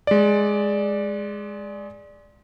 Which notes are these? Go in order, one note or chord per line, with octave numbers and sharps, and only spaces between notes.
G#3 D5